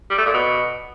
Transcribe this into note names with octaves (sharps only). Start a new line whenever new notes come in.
G3
A3
A#2
B2